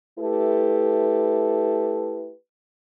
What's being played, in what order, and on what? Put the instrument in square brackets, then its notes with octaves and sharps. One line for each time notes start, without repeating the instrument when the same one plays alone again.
[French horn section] A3 E4 G4 A4 B4